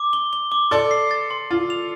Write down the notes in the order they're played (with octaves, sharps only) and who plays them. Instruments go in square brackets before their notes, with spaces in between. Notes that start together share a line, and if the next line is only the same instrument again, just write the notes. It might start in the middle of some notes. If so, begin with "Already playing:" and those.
Already playing: [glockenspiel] D6
G7
G7
D6
[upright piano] A4 D5 [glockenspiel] C6
[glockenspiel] C7
A6
C6
[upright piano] F4 [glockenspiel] A6
[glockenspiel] F7